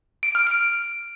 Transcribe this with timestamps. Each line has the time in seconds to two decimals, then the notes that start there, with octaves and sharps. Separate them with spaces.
0.23 D7
0.35 F6
0.47 D7